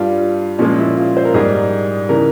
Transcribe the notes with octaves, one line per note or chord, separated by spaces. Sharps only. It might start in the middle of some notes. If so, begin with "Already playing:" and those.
Already playing: G2 G3 F4
A#2 F3 G#3 C#4
E4
F4
C5
A#4
G#2 G3 G#4
C#3 E3 A#4